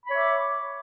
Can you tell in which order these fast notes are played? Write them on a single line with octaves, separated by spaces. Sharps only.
B5 C#5 E5 D6